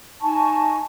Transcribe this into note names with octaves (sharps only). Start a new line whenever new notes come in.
D#4 G#5 A5 C#6